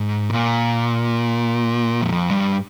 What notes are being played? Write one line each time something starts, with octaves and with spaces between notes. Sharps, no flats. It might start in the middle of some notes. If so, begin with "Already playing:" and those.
Already playing: G#2
A#2
F2
G2